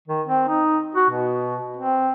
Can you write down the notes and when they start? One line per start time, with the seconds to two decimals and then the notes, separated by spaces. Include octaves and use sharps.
0.08 D#3
0.27 C4
0.48 D#4
0.95 F#4
1.10 B2
1.77 C4